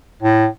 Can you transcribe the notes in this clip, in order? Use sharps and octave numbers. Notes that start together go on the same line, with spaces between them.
A2